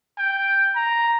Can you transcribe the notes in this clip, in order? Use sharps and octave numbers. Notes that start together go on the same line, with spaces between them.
G5
A#5